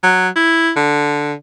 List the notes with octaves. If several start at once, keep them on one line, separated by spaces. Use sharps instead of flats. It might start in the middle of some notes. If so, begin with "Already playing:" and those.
F#3
E4
D3